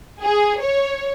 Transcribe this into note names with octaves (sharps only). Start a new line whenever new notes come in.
G#4
C#5